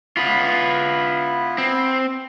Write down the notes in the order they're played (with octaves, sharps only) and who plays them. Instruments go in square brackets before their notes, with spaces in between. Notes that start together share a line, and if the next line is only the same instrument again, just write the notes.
[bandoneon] B3 E4 [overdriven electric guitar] F4 B4
[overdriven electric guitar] C4